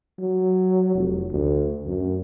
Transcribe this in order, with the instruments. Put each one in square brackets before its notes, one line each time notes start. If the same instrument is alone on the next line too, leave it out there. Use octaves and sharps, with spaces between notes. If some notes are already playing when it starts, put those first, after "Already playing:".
[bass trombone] F#3
F1
D2
F#2